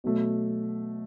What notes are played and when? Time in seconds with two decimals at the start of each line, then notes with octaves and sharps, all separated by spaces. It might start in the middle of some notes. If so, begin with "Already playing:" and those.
0.04 B2 F#3 A3